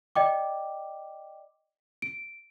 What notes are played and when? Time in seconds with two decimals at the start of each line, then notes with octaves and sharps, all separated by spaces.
0.15 D5 D#5 G5 D6
2.02 D7